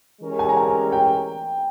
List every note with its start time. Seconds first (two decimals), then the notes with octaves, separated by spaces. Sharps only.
0.21 E3 G#3 C#4 G4 A#4
0.39 G#5
0.49 A#5
0.57 G#5
0.92 G5